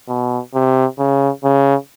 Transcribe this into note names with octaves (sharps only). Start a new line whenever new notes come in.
B2
C3
C#3
C#3